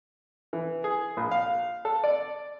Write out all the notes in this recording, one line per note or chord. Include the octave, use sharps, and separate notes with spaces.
E3
G#4
A#1
F5
A4
D5